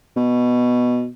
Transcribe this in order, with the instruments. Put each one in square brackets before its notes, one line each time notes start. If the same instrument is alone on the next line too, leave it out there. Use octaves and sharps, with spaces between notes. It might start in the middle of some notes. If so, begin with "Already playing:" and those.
[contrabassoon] B2